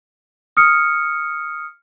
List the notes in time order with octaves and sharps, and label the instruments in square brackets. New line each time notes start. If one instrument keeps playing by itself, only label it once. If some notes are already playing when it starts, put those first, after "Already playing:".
[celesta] D#6 F6 C#7